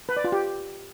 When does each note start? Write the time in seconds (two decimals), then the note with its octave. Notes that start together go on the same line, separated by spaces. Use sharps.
0.09 B4
0.17 D5
0.24 F4
0.32 G4